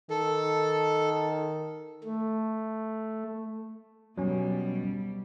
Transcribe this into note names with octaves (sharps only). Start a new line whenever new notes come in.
D#3 A4
A3
B2 F#3 G3 C#4